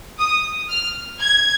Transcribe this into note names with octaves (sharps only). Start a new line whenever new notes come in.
D#6
F6
G#6